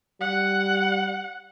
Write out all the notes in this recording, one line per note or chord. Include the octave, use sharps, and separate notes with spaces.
G3 F#5